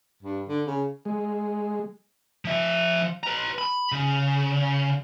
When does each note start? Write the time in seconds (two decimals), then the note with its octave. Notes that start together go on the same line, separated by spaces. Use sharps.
0.23 G2
0.48 D3
0.67 C#3
1.05 G#3
2.45 F3 E5
3.23 B4 A#5
3.58 B5
3.92 C#3